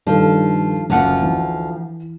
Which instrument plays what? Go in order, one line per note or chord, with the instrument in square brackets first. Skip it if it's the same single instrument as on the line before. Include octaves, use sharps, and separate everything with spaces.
[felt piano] G2 D#3 A4 [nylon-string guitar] F3
[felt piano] F#1 [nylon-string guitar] D2 F3 F#5
[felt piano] E3